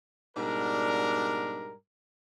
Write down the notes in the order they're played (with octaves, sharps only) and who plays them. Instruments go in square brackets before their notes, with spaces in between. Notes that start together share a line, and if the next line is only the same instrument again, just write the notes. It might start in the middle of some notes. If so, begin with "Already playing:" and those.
[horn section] G#2 B2 G3 D4 A#4